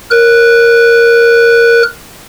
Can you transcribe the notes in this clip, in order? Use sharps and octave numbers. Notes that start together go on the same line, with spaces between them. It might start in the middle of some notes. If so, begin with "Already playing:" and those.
A#4 F#6